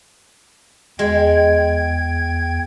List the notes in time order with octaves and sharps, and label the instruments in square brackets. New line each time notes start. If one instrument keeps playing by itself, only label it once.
[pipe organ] E2 G5 G#6 [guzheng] G#3